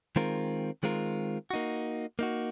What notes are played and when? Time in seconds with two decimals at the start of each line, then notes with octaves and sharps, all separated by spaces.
0.16 D#3 G#3 C4 F4 A#4
0.83 D#3 G#3 C4 F4 A#4
1.51 A#3 D#4 F#4
2.19 A#3 D#4 F#4